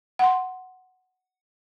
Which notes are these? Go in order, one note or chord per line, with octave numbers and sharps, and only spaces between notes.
F#5 C6